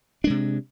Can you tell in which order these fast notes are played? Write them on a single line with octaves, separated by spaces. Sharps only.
D4 G#3 C3